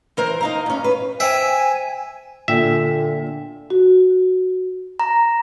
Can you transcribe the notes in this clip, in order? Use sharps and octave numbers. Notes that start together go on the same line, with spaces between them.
E3 A#4 C5
D#4 F5 A#5
G2 C#4
B4
C5 E5 G5 G#5
A#2 D3 F4 E5 G5 G#5
F#4
A#5